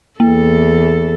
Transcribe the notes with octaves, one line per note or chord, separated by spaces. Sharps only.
E2 A#3 A4